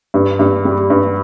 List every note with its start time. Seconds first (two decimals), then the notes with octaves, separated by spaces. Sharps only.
0.14 G2
0.39 G2
0.65 G3
0.90 G2